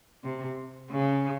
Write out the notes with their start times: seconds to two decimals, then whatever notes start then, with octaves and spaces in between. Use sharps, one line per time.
0.24 C3
0.91 C#3